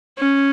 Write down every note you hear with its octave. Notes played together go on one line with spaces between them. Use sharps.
C#4